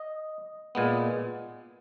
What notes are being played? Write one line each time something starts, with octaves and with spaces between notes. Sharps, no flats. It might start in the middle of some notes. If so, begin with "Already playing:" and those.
Already playing: D#5
A#2 G#3 B3